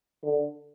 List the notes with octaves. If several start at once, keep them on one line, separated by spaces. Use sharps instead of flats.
D3